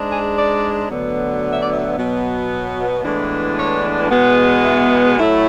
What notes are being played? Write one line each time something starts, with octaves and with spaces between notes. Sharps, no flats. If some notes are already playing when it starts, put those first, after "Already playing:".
Already playing: G#2 G#3 D4
G#4
D5
D2 D3 F#3 B3
E5
D5
E5
B2 F#3 B3
A2 E3 G#3 B3 D4
C#5
E2 B2 G#3 B3
E5
A2 F#3 A3 E4